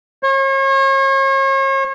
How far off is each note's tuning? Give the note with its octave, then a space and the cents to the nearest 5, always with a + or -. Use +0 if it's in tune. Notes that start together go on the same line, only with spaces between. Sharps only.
C#5 -40